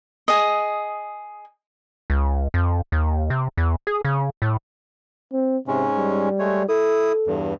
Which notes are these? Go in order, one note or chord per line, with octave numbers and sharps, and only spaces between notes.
G#4 D#5
C#2
F2
D#2
C3
E2
G#4
C#3
A2
C4
G#2 C3 G#3 C#4
G3
G#3 A3 C#5
E4 A4 D#6
E2 G2